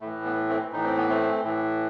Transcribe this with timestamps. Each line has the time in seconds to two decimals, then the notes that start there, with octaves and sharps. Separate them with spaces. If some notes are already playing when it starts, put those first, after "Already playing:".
0.01 A2 E3 A3
0.25 B3
0.49 A3 C4
0.73 A2 E3 D#4
0.84 C4
0.97 B3
1.09 A3 C4
1.44 A2 E3